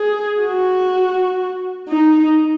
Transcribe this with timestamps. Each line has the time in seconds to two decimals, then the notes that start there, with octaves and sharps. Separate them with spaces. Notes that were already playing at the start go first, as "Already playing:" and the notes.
Already playing: G#4
0.41 F#4
1.89 D#4